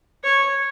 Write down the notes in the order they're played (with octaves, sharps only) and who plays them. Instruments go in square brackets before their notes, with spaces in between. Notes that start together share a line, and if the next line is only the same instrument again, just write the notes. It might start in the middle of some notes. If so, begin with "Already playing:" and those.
[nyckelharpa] C#5